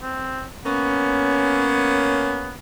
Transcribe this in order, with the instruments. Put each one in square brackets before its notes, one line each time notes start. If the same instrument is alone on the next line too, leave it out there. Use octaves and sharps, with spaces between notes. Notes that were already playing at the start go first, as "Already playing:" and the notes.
[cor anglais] C4
[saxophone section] A#3 C#4 [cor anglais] B3